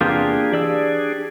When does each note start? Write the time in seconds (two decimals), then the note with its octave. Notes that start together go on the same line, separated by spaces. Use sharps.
0.01 E2 C3 A#3 B3 D4 F4 G4 G#4
0.52 E3 G4 D5 E6